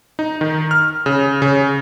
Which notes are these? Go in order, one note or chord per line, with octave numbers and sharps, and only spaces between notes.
D#4
D#3
F6
C#3
C#3